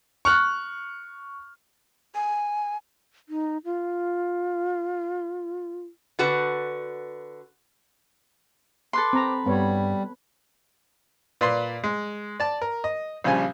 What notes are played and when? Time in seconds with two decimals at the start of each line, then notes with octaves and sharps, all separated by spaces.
0.25 C#6 F6 F#6
2.15 G#5
3.29 D#4
3.65 F4
6.19 D3 F#4 B4
8.93 A4 B4 C6 D6
9.13 C4 A#5
9.46 G2 G3 B3 C#5
11.41 A#2 B4 D5 C6
11.84 G#3
12.40 D5 A5
12.62 A#4
12.84 D#5
13.24 A#1 C#3 F3 G3 G#5